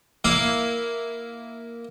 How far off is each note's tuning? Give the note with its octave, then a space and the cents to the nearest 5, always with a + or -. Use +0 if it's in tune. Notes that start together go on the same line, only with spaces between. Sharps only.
A#3 +0 E4 +0 F5 +0